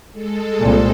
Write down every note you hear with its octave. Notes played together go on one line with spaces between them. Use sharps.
G#3 A4
C2 A#2